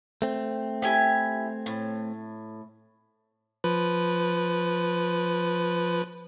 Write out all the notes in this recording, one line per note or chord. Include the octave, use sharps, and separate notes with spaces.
A3 C4
E4 G4 G#5
A2
F3 B4